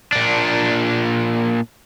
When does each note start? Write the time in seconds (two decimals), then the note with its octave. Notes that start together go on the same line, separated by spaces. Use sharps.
0.12 A#2 D4